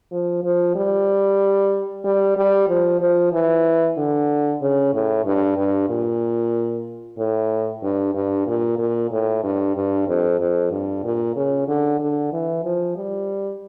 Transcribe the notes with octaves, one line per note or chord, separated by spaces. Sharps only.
F3
F3
G3
G3
G3
F3
F3
E3
D3
C#3
A2
G2
G2
A#2
A2
G2
G2
A#2
A#2
A2
G2
G2
F2
F2
G2
A#2
C#3
D3
D3
E3
F3
G3